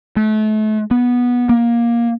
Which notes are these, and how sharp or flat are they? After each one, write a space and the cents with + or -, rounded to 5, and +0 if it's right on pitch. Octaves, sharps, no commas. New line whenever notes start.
A3 -35
B3 -15
A#3 +15